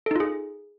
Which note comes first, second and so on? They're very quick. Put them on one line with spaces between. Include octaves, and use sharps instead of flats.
A4 D#4 F4 G#4